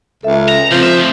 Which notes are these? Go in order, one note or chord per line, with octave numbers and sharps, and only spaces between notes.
C#2 A4 E5
A#5
C#2 F3 C4
E5
D2